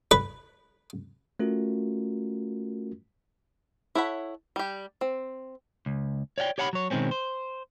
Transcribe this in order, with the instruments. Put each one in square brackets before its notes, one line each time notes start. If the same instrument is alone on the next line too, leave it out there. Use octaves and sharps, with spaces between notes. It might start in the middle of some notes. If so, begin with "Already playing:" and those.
[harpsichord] B4
[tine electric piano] A3 C#4 F4 F#4 A#4
[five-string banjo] E4 A4 C#5 F#5 B5
G3 G4
C4
[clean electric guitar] C#2
C#5 D5 F5 G5
G4 C#5 F#5 A5 B5
F#3 C#5
B2 D#3 G#3 C4 C#4
C5